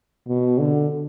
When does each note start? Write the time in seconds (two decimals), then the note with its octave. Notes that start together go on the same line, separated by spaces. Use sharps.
0.28 B2
0.59 D3